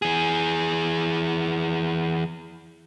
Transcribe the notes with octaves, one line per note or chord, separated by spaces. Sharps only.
E3 G#4